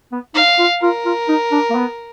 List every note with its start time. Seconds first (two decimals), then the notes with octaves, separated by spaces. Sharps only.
0.12 B3
0.35 D#4 F5
0.59 F4
0.82 F4 A#4
1.05 F4
1.28 D#4
1.52 D4
1.70 A#3
1.75 B3